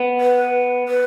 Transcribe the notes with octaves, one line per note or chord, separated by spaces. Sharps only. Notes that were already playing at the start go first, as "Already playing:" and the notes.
Already playing: B3
B4
B4